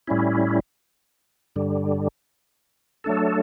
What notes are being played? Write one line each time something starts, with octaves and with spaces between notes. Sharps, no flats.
A2 G3 C#4 E4
G2 D3 G3
F#3 A3 D4 A4